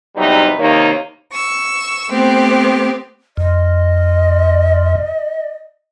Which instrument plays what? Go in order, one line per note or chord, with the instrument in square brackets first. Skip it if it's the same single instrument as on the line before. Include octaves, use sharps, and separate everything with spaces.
[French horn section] E2 C3 F#3 G3 D#4 B4
D#2 C3 D#3 A#3 D#4 C#5
[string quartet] C#6 E6
A3 B3 C4 G4
[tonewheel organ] F2 [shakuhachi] D#5